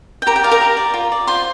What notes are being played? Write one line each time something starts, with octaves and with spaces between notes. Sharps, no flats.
G5
G4 A#4 A#5
G5
D5 F5
A#4 A#5
G4
D5
F4
D5
F4 C5 C6